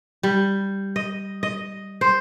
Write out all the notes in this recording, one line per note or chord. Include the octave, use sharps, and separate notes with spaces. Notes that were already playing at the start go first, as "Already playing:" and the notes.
G3
D#5
D#5
C5